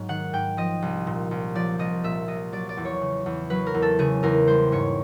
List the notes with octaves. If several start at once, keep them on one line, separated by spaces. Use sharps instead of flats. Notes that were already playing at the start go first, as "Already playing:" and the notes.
Already playing: G#2 F#3
D#3 F#5
G#2 G5
F3 D#5
C2
A#2
C2
F3 D5
C2 D#5
A#2 E5
C2 D#5
F#3 D5
D5
E2
C#5
C#3
E2
F#3 B4
A#4
E2
A4
C#3 G#4
E2 A#4
G3 C5
G#2 C#5